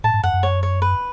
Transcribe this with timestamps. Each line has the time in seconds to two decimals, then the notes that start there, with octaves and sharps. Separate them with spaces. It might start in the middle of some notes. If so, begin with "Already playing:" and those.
0.04 A2 A5
0.14 G#2
0.23 F#2 F#5
0.33 F#2
0.43 C#5
0.63 C#5
0.82 B4